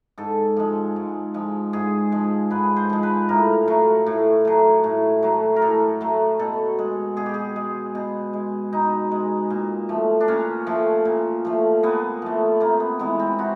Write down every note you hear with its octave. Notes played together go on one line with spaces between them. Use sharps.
G#2 A4
F3 G#3
G#2
F3 G#3
G#2 G#4
F3 G#3
G#2 B4
C5
F3 G#3
B4
A2 A#4
F#3 A3
A2
F#3 A3
A2
F#3 A3
A#4
A2 A4
F#3 A3
B2 A4
G#3
B2 G#4
G4
G#4
G#3
B2
G#3
B2 D#4
G#3
A#2
F3 A3
D4
A#2 C#4
F3 A3
A#2
F3 A3
A#2 B3
F3 A3
C3 A#3
B3
E3 G#3 B3
C4
C3 F#4